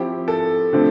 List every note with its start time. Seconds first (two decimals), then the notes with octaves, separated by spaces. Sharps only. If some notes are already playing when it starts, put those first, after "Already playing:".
Already playing: F3 C4 E4 G4
0.28 A4
0.73 D3 F3 A3 C4